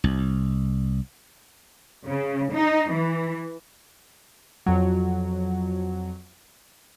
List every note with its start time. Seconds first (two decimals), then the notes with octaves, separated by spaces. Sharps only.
0.04 C2
2.08 C#3
2.53 D#4
2.92 E3
4.66 F2 F#3